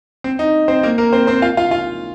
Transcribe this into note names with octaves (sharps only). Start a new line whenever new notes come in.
C4
D#4
C4 C5
A#3 A#4
A#3 A#4
C4 C5
C4 C5
F4 F5
F4 F5
F4 F5